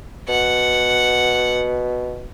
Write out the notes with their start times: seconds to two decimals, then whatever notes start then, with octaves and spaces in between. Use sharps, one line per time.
0.29 B2 F#5